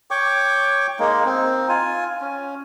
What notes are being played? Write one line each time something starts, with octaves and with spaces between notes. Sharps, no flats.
C#5 G5 C#6 D6
G#3 A#3 D#4
C4 D#4
F4 G#5
C#4